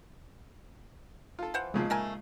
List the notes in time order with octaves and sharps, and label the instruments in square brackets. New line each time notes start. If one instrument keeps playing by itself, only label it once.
[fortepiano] F4 A4
[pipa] E3 C5 F#5
[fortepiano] A#2 C#3 F3 [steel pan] G#3
[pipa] A3 A#4 G#5